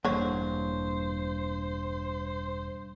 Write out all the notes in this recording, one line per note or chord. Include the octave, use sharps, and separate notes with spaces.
E1 G2 D3 E3 A#3 C5 C#5